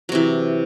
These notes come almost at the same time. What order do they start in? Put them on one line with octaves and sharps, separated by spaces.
F#3 C3 E3